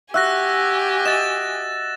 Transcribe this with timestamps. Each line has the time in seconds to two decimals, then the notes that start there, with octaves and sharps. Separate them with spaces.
0.14 F#4 G4 E5 G#5 E6 F#6 A#6
1.05 D#5 A6 E7